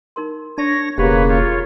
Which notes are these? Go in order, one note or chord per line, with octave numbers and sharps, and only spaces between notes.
D#4 A#4 C6
D4 C#5 A5 A#6
E1 C#3 A#3 G4 B4 C#5 F#5
F4 C#5